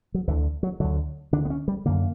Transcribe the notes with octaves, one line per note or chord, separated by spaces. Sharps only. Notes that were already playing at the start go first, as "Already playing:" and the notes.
F#3
D2 D3 E3
F#3
D2 D3 F#3
D2 D3 D4
B3
C#4
G3
F#2 D3 A#3